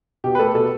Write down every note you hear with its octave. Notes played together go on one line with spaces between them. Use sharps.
B2 G4
B4
A3 A4
B2 A4